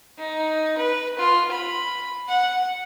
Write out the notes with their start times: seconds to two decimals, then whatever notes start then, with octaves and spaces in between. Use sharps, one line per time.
0.19 D#4
0.77 B4
1.19 F4
1.51 B5
2.29 F#5